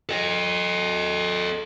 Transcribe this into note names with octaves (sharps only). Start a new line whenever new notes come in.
A4 D#5